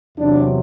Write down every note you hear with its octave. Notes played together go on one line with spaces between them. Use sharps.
E2 C3 F#3 D4